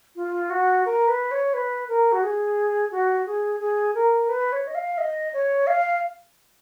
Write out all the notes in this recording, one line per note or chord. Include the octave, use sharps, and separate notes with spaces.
F4
F#4
A#4
B4
C#5
B4
A#4
F#4
G#4
F#4
G#4
G#4
A#4
B4
C#5
D#5
F5
D#5
C#5
F5